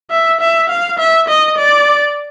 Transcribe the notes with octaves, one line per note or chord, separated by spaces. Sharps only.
E5
E5
F5
E5
D#5
D5